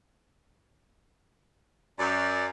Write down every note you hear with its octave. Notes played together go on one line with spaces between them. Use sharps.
F#2 D5